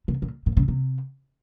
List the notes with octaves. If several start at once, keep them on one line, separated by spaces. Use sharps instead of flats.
C3
A#2
A#2
C#3
C3